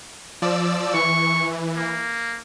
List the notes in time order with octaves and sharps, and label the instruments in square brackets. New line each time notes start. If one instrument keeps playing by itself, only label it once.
[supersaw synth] F3 D5 E6
[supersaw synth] E3 [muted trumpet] C#6
[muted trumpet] A#3